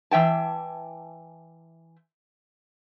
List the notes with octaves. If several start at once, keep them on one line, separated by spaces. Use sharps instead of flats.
E3 E5 G5 A5